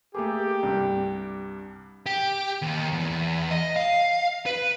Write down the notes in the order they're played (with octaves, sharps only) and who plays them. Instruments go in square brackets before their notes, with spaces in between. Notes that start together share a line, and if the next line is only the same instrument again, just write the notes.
[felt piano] A3 A#3 G#4 [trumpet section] G4 [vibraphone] D6
[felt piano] C2 G2
[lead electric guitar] G4
D#2
E2
D#5
F5
B4